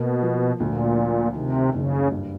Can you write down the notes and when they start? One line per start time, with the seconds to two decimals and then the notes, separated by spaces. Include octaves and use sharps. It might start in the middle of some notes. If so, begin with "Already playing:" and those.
Already playing: B2 A#3
0.22 F3
0.60 D2 A#2
0.98 F3
1.35 C3 D#3
1.74 F#1 C#3
2.12 G2